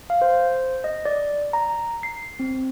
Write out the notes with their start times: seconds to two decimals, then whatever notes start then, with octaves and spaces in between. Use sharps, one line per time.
0.10 F5
0.22 C5
0.84 D#5
1.05 D5
1.53 A#5
2.03 C7
2.39 C4